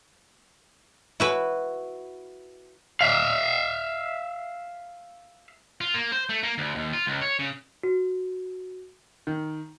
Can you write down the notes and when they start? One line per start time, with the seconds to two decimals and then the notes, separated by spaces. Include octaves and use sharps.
1.20 E4 F#4 B4
3.01 E5 F5
5.81 F4
5.94 A#3
6.12 C5
6.29 A3
6.43 A#3
6.58 D2
6.75 D#2
6.93 F4
7.07 C#2
7.21 C#5
7.39 C#3
7.83 F#4
9.27 D#3